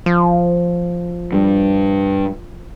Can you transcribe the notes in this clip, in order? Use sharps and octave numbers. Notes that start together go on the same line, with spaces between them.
F3
G2